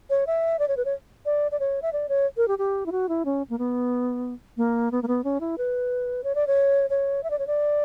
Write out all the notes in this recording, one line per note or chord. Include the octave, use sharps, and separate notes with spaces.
C#5
E5
D5
C#5
B4
C#5
D5
D5
C#5
E5
D5
C#5
A#4
G4
G4
E4
F#4
E4
C#4
A#3
B3
A#3
B3
A#3
B3
C#4
E4
B4
C#5
D5
C#5
C#5
E5
D5
C#5
D5